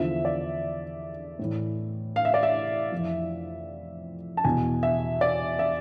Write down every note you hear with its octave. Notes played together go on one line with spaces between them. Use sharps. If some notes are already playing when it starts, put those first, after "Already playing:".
Already playing: E2 D3 F3 E5
D5
A2 E3
F5
E5
D5
E5
F2 E3
A5
E2 B2 G#5
E5
D5
E5